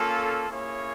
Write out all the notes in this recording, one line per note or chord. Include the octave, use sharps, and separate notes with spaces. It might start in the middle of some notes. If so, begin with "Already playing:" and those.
Already playing: A#3 C#4 F4 A4
A#3 C#4 E4 G#4 C#5